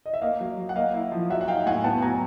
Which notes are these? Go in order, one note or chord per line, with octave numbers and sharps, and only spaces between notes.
D#5
E5
A#3 D#5 F5
F#3
F#3
F#5
A#3 D#5 F5
E4
F3
F#3 E5 F#5
F#5
D#4 F5 G5
A2 F#5 G#5
B3 G5 A5
F#3 G#5 A#5